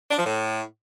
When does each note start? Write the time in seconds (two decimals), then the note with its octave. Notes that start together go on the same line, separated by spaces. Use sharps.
0.11 D4
0.18 F3
0.26 A2